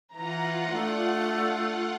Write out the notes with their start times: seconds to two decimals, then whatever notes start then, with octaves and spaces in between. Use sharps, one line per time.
0.14 E3 F4 F#5 A#5
0.72 A3 D4